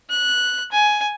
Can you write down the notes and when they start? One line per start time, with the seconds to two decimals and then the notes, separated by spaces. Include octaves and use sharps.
0.10 F#6
0.71 G#5